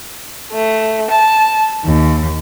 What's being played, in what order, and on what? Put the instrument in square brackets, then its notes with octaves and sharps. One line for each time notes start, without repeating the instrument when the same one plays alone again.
[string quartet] A3
A5
D#2